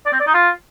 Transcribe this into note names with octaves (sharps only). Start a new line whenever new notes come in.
D5
C4
D5
D#4
F4